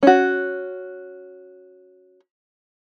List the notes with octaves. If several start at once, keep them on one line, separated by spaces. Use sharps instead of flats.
C#4 F#4